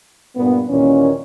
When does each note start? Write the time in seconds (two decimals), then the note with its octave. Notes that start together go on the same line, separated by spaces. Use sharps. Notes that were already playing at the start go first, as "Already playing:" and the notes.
0.36 G2 A#2 B3
0.69 D#2 A#2 E3 C#4